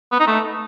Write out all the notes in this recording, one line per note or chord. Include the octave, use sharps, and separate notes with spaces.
B3
D#4
A3